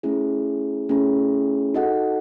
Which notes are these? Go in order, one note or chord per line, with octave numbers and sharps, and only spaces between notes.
A3 C#4 E4 G#4
A3 C#4 E4 G#4
D#4 F#4 A4 D#5 F#5